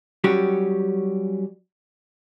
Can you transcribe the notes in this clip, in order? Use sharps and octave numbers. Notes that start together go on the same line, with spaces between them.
F#3 G3 C#4 F#4 G4